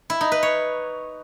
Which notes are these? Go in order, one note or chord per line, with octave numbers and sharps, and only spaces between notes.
E4
D#4
B4
C#5